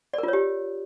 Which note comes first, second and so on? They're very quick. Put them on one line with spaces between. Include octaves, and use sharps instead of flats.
D5 A#4 F4 C#5 G4